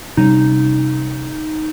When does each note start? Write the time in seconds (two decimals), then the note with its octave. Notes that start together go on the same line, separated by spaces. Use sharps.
0.17 C3 G3 C#4 D#4